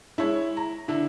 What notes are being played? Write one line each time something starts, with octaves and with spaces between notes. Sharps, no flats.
G#3 E4 C#5 E5
A#5
D3 E4